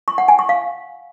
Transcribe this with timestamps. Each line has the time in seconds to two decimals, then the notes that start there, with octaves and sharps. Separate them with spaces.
0.08 C#6
0.18 F#5
0.28 G#5
0.39 C#6
0.49 F5